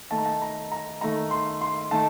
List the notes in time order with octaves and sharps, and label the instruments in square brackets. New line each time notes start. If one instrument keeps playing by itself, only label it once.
[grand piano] D#3 A3 D#4 A5
A#5
A5
A#5
A#5
D#3 A3 D#4 A#5
C6
C6
D#3 A3 D#4 A5